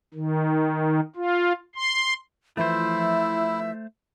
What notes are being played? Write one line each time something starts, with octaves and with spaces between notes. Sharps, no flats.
D#3
F4
C6
E3 F3 A3 E4 C5 E5